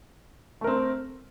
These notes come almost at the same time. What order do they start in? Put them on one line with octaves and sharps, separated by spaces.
A3 A#4 C4